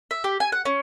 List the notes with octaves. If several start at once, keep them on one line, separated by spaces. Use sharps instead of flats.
E5
G4
G#5
F#5
C#4